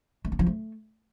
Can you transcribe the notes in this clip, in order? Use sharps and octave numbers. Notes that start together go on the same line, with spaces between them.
A3
A#3
F3
A3